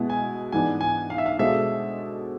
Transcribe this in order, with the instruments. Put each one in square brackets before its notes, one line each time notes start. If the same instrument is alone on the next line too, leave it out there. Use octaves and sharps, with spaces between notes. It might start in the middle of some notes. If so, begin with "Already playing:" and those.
Already playing: [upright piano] B2 G#3 B3 E4
[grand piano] G#5
[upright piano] G#2 E3 B3 D4 [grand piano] G#5
[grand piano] G#5
F5
E5
F5
[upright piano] B2 G#3 D4 A4 C5 [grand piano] E5